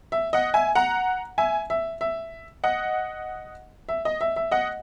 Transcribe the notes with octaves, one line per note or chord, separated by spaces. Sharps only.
E5
D#5 F#5
E5 G#5
F#5 A#5
E5 G#5
E5
E5
D#5 F#5
E5
D#5
E5
E5
D#5 F#5